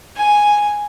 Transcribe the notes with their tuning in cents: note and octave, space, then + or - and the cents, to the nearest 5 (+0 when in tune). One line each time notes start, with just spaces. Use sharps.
G#5 +0